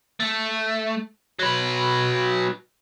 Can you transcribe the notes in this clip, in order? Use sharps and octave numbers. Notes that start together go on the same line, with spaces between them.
A3
F#3 B4